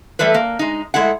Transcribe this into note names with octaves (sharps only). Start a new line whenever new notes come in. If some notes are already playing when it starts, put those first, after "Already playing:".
E3 G3 A3 A4 B4
A#3
G#3 D#4
G#3 A3 E4 F#5